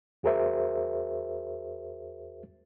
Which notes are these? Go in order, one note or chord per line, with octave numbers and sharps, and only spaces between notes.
E2 F#4 G#4 A#4 C5 E5